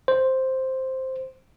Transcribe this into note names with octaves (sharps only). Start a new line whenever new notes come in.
C5